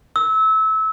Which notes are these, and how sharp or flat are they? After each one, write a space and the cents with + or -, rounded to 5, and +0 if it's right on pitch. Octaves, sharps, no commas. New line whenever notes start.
E6 -25